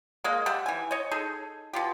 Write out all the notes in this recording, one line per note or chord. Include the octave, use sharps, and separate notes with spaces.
G#3 A#3 D#5
G3 G4 E5 F#5
E3 G#5
C#5 D#5
D#4 G#4 A4
B2 F4 G4